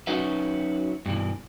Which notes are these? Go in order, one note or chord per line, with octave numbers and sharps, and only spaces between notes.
F#3 C#4 D#4 F#4 B4 E5
G2 B2 E3